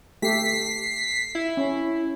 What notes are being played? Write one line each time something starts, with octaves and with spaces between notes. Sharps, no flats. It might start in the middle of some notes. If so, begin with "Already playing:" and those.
A3 G4 B6 C7
E4
C#4